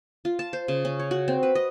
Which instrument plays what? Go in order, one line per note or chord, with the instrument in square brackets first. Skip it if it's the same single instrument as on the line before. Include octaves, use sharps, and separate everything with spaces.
[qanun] F4
A5
C5
C#3
C#4
C#5
F#4
C4
B4
D#5